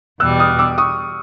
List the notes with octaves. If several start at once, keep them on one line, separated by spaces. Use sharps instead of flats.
E2 B2 G3 E6 F#6
D#6 F6
D6 E6
C#6 D#6